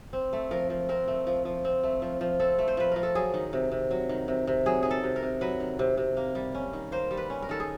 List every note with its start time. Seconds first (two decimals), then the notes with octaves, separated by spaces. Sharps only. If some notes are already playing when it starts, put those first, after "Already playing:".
0.13 C4
0.33 A3
0.51 F3 A#4
0.70 F3
0.89 C4 A#4
1.08 A3
1.27 F3
1.45 F3
1.65 C4
1.83 A3
2.02 F3
2.21 F3
2.40 C4 A4
2.59 A3
2.68 C5
2.77 F3 B4
2.92 F3 A#4
3.03 A4
3.15 F#3 G#4
3.34 D#3
3.53 C3
3.71 C3
3.91 F#3
4.09 D#3
4.28 C3
4.47 C3
4.66 F#3 G#4
4.83 D#3 G#4
4.91 A4
5.03 C3
5.16 A#4
5.23 C3
5.41 F#3 B4
5.60 D#3
5.79 C3
5.97 C3
6.17 A#3
6.35 G3
6.55 C#4
6.73 D#3
6.92 A#3 C5
7.11 G3
7.17 B4
7.30 C#4
7.42 A#4
7.49 D#3 A4
7.60 G#4